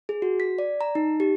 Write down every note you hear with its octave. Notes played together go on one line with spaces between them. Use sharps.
G#4
F#4
B6
D5
A#5
D#4
G4